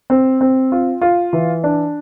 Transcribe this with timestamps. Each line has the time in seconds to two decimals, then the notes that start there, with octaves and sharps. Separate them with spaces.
0.10 C4
0.41 C4
0.72 F4
1.01 F4
1.33 E3
1.64 D4